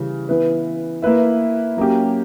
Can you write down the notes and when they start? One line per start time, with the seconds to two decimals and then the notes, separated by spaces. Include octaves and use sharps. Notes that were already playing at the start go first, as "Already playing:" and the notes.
Already playing: C#3 E3 G3 C#4
0.29 E3 B3 E4 B4
1.02 A#3 E4 B4 E5
1.77 F#3 A#3 C#4 G4